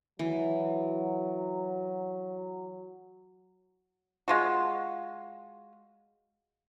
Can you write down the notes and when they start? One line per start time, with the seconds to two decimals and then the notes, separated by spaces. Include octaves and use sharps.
0.19 E3 F#3
4.28 G#3 F4 F#4